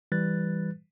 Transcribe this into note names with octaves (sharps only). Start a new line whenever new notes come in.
E3 G3 B4 F#6 A6